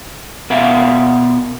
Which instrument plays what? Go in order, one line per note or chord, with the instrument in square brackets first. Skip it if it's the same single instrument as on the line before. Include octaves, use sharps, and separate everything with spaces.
[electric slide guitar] B2 A#4 E5 F5